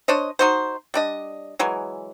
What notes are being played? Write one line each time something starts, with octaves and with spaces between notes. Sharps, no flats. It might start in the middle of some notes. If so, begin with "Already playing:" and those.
D4 C5 C#5 D#5
D#4 F#4 C5
G3 D4 D#5
E3 F#3 G#3